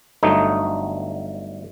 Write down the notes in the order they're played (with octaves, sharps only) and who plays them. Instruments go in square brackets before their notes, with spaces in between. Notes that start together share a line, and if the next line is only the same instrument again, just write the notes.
[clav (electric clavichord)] G1 G2 F#3 A3 D#4